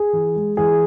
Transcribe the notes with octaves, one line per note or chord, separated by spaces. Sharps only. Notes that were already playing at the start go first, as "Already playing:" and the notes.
Already playing: G#4
E3
G#3
E3 G#4